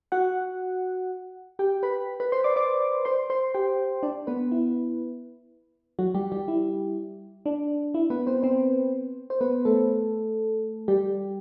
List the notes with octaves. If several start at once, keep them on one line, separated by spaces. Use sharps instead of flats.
F#4 F#5
G4 G5
B4 B5
B4 B5
C5 C6
D5 D6
D5 D6
C5 C6
C5 C6
G4 G5
D4 D5
B3 B4
E4
F#3 F#4
G3 G4
G3 G4
E4
D4
E4
B3 B4
C4 C5
C4 C5
C5
B3 B4
A3 A4
G3 G4